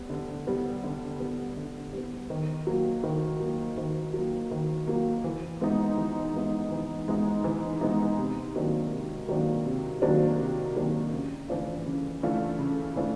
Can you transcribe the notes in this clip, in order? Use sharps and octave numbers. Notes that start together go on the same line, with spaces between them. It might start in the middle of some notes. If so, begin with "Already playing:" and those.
Already playing: G3 B3
D3
G3 B3
D3
G3 B3
D3
G3 B3
D#3
F#3 A#3
D#3
F#3 A#3
D#3
F#3 A#3
D#3
F#3 A#3
E3
G#3 B3 D#4
E3
G#3 B3 D#4
E3
G#3 B3 D#4
E3
G#3 B3 D#4
C3
D#3 F#3 A#3 D4
C3
D#3 F#3 A#3 D4
C3
D#3 F#3 A#3 D4
C3
D#3 F#3 A#3 D4
C#3
E3 A3 D4 F4
C#3
E3 A3 D4 F4
C#3
E3 A3 D4 F4